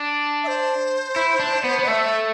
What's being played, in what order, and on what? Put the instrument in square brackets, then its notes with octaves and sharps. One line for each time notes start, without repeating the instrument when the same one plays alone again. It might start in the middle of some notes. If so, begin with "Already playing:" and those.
Already playing: [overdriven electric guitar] D4
[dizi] E5
C5
[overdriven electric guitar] E4
D4
B3
B3
[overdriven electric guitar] A3 [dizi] E5